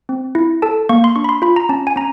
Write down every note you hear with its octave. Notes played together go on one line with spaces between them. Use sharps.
C4
E4
A4 A5
A#3 C#6
C6
D4 C#6
B5
C6
F4 B5
A#5
C#4 A5
G#5
C#4 A#5